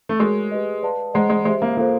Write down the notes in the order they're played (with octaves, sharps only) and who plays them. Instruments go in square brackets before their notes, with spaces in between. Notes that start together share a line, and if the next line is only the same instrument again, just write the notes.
[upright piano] A3
[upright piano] G#3 [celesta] F#4 A#4 C#5
[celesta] G4 B4 D#5
B4 D5 F5 A5
[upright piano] G#3 [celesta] C5 D#5 F#5 A#5
[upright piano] G#3
[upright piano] G#3 [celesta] G4 C5 E5
[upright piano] A#3
[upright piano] A#3 [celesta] F4 A4 C5